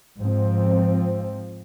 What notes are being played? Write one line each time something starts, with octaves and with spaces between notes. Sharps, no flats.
G#2 F3 C4